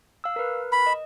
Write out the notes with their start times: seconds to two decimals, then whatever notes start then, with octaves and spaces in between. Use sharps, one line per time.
0.24 F5 E6
0.36 A#4 B4
0.72 B5
0.87 D#5